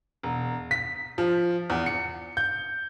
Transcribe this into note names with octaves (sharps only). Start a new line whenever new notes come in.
E1
B6
F3
E2
C#7
G6